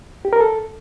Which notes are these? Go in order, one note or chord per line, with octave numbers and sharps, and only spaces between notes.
G4
A#4
A4